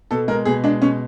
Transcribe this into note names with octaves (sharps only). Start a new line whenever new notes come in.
B2 A4
G#3 A#4
B2 G#4
G#3 D4
B2 C#4